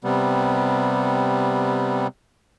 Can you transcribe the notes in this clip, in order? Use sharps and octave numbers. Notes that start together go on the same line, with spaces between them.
C3 G3 B3